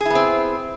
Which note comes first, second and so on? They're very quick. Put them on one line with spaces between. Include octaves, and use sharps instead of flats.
G#4 E4 B3 C4